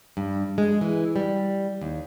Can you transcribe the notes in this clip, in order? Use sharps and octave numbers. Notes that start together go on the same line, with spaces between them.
G2
G#3
E3
G3
D#2